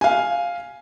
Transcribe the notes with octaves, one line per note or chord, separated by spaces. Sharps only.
F5 G#5